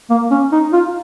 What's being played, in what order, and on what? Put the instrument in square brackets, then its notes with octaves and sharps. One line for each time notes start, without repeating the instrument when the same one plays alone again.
[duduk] A#3
C#4
D#4
F4